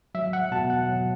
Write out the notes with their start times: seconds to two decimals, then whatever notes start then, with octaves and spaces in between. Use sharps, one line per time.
0.15 F#3 E5
0.33 F#5
0.51 B2 A5
0.70 F#5
0.89 F#3